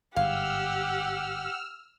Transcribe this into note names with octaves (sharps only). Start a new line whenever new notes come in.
G1 G#2 G4 F5 F#5 E6 F6